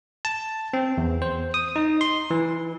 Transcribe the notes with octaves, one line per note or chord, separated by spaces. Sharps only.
A5
C4
E2
C5
D#6
D#4
C6
E3